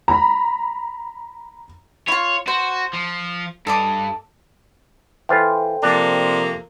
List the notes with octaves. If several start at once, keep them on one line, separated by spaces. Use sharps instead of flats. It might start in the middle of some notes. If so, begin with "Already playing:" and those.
A#5 B5
E4 F4 C#5
F#4 C5
F3
G2 A4 D#5 D6
E3 F4 A4 C5 G5
C3 F3 A#3 D4